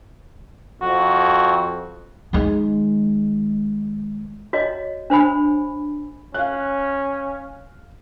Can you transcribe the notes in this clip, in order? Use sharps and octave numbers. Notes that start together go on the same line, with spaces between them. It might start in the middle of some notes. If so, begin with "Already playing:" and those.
F2 F#4
D#3 G#3
F#4 C#5 D#5
D4 C5 G#5 B5
C#4 F5 F#6